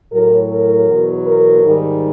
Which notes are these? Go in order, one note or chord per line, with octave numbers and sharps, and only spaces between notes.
A2 F#3 A#4
A#4
E2 B2 F#3
A#4
G#2 D#3 G3